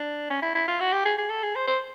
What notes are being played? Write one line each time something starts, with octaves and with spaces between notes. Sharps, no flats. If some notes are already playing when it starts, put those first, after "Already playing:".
Already playing: D4
C#4
E4
E4
F4
F#4
G4
G#4
G#4
A4
G#4
C5
C5